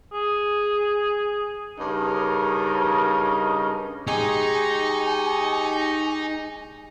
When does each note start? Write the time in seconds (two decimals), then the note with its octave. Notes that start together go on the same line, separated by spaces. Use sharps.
0.13 G#4
1.78 G2 C#3 D#4 A#4
4.07 G#3 D#4 G4 G#4 D#5 G#5 C#6